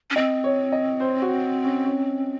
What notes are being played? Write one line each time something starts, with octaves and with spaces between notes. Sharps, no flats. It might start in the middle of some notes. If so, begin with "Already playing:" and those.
C#4
C4 D#5
C#5
D#5
C5
F#4
C#4
C#4